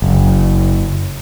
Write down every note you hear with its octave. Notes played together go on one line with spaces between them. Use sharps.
F#1